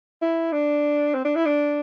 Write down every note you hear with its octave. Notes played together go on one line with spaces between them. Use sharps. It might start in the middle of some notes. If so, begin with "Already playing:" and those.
E4
D4
C4
D4
E4
D4